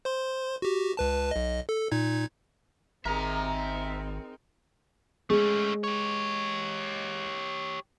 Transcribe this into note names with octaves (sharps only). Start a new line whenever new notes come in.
C5 C6
F#4 G4
C#2 B4 A5
B1 D#5
A4
A#2 D#4 G#6
G#1 C4 D#4 G#4 A#4 E5 A#5
G#3 A3 C#4
G4 C#5